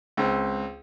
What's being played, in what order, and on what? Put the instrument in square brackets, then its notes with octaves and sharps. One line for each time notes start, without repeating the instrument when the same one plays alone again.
[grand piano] C#2 C4